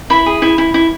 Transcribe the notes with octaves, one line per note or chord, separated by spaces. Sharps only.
E4 B5
G#4
E4
E4
E4